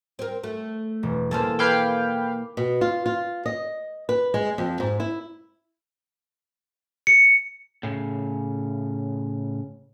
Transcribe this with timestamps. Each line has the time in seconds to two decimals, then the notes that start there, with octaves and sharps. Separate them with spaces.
0.19 C4 A#4
0.44 A3
1.03 E1
1.31 E3 A#3 A4 C5 A5 F6
1.59 B4 F5 G5 B5 D6 G#6
2.57 B2
2.81 F4
3.06 F4
3.46 D#5
4.09 B4
4.34 G#3
4.58 F2
4.80 G#2
5.00 E4
7.07 C#7
7.83 A2 C#3